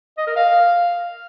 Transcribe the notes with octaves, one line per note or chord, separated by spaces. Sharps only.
D#5
A#4
F5